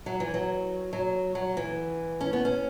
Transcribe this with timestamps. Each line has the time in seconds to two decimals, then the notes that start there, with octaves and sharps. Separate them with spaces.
0.06 F#3
0.20 E3
0.34 F#3
0.93 F#3
1.35 F#3
1.57 E3
2.21 C#4
2.33 B3
2.45 C#4